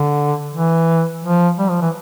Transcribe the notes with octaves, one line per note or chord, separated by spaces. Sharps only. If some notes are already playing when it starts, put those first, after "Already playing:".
Already playing: D3
E3
F3
G3
F3
E3